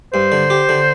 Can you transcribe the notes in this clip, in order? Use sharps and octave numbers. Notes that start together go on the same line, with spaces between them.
G2 C5
D3
G4
D3